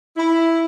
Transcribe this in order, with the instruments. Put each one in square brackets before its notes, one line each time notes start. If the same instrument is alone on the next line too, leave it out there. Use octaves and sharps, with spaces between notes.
[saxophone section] E4